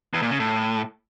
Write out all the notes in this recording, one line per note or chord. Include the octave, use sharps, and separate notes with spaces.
E2
A#2
C#3
A2